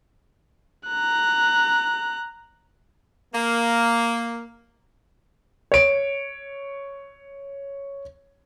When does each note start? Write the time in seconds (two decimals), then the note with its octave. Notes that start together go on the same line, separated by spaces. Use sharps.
0.87 A#5 F#6
3.35 A#3
5.72 C#5 D7